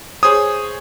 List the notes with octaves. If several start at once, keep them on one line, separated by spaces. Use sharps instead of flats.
G#4 C5 C#5 D#6